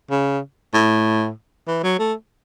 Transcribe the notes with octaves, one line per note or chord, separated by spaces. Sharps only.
C#3
A2
E3
F#3
A3